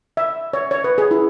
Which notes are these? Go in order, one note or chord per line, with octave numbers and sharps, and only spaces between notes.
E5
C#5
C#5
B4
G#4
E4